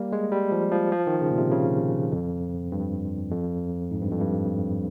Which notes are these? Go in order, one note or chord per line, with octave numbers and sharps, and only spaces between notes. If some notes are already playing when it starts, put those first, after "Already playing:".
Already playing: G3 A#3
G#3
G3
F3
F3
F3
D#3
C#3
A#2
C3
C#3
F2
G2
F2
G#2
G2
F2
G2